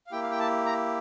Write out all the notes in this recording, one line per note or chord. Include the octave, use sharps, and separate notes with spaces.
F5
A#3 E4 G4 G5
F5
G5
A5
A#5